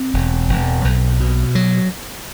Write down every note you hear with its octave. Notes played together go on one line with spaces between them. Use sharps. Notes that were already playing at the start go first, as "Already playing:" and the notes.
Already playing: C4
E1
E1
B1
B2
F#3